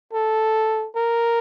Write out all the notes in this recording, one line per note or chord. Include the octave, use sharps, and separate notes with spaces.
A4
A#4